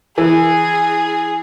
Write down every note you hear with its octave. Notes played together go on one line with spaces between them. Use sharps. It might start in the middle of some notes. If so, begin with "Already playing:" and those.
E3 G#4